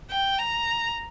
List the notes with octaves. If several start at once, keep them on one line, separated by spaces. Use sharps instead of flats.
G5
A#5